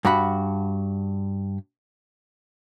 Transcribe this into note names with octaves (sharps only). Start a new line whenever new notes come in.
G2 F#4 F#5 B5